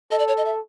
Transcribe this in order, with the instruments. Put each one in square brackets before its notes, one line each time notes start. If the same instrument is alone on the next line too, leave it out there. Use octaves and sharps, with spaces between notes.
[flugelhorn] A4 [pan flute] D#5
[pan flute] D5
C#5
D#5
E5